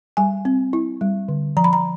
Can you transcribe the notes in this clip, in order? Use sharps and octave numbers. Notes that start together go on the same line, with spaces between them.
G3 G#5
C4
E4
G3
D3
F3 A#5
B5
A#5